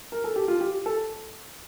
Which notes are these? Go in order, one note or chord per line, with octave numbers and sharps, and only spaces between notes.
A#4
A4
G4
F4
G4
A4